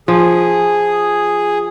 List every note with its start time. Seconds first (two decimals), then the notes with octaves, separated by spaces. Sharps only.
0.08 F3 G#4